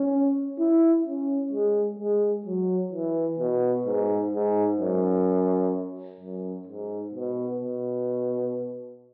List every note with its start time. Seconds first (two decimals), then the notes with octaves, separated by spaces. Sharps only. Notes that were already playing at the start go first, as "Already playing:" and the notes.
Already playing: C#4
0.59 E4
1.06 C#4
1.52 G#3
1.99 G#3
2.46 F#3
2.92 E3
3.40 B2
3.86 G#2
4.33 G#2
4.80 F#2
6.20 F#2
6.67 G#2
7.14 B2
7.61 B2